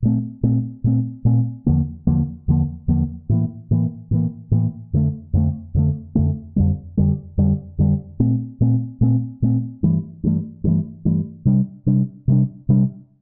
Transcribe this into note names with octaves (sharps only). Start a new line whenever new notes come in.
A#2 A3 C4
A#2 A3 C4
A#2 A3 C4
A#2 A3 C4
E2 D3 F3 A#3
E2 D3 F3 A#3
E2 D3 F3 A#3
E2 D3 F3 A#3
A2 E3 A#3
A2 E3 A#3
A2 E3 A#3
A2 E3 A#3
F2 D3 A3
F2 D3 A3
F2 D3 A3
F2 D3 A3
F2 D3 G3
F2 D3 G3
F2 D3 G3
F2 D3 G3
A#2 A3 C4
A#2 A3 C4
A#2 A3 C4
A#2 A3 C4
G2 E3 A3
G2 E3 A3
G2 E3 A3
G2 E3 A3
C3 G3 D4
C3 G3 D4
C3 G3 D4
C3 G3 D4